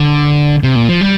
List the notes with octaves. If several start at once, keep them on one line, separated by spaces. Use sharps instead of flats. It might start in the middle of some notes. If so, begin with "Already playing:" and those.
Already playing: D3
C3
A#2
F3
G3